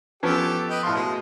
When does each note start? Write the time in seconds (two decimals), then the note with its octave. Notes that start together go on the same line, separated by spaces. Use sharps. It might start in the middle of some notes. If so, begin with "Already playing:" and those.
0.23 F3 B3 C#4 G4 A4
0.70 B4 D#5 G5
0.83 A2 F3 C6
0.95 B2 G#3